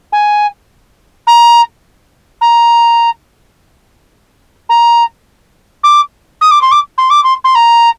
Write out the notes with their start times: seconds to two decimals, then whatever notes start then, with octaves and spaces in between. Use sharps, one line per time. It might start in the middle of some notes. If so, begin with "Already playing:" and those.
0.12 G#5
1.27 A#5
2.41 A#5
4.69 A#5
5.83 D6
6.41 D#6
6.51 D6
6.61 C6
6.71 D6
6.98 C6
7.10 D6
7.24 C6
7.44 C6
7.55 A#5